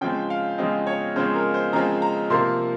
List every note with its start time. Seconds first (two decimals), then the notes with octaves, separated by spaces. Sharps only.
0.01 C#3 F3 G#3 C4 G5
0.30 F5
0.58 C#3 F3 G#3 C4 D#5
0.87 C#5
1.16 C#3 F3 G#3 C4 C5
1.35 A#4
1.54 C5
1.73 C#3 F3 G#3 C4 A#5
2.02 A#5
2.30 C3 F3 A#3 C6